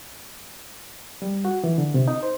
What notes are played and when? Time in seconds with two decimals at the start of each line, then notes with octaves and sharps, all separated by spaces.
1.22 G3
1.45 F#4
1.64 E3
1.78 D3
1.94 C3
2.08 D#4
2.23 C5